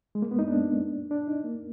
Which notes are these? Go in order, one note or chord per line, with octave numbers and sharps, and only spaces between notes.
G#3
A#3
B3
D#4
D4
D4
D#4
A#3